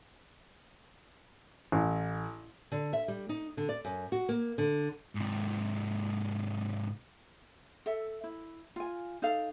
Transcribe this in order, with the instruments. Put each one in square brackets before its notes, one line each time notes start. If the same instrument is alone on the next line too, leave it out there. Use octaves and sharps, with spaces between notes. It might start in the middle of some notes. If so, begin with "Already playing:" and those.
[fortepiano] A1
[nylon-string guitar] D3
E5
G3
D#4
D3
D5
F#2
F#4
A#3
D3
[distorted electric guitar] G#2 C3
[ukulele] A4 E5
E4
F4 G#5
D#4 A4 F5